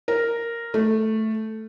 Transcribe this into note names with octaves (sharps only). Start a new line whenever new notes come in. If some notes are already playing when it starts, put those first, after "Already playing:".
A#4
A3